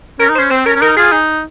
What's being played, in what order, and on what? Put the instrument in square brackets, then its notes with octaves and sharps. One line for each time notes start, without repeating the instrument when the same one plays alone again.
[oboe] C#4 [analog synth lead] A#4
[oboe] D#4
[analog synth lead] C5
[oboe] C#4
[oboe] C4 [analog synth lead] C5
[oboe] C#4 [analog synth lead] A#4
[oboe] C#4
[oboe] D#4 [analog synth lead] A#4
[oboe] F4 [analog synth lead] G#4
[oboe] D#4